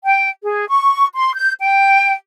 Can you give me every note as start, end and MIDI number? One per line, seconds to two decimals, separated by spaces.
0.04 0.29 79
0.43 0.68 68
0.70 1.07 85
1.15 1.34 84
1.34 1.53 91
1.62 2.13 79